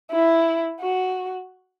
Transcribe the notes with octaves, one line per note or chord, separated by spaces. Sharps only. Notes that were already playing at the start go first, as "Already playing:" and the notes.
E4
F#4